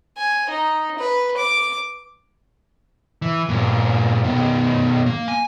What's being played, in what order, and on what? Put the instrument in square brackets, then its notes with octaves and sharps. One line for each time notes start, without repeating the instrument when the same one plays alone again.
[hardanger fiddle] G#5
D#4
B4
D6
[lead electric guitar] E3
G2 A#2
B2 D#3
A#3
G#5